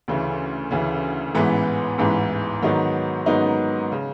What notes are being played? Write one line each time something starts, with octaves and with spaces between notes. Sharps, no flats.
D2 C#3 E3
D2 C#3 E3
A1 G#2 E3 G#3 B3
A1 G#2 E3 G#3 B3
G#2 D#3 F#3 B3 D#4
G#2 D#3 F#3 B3 D#4
C#3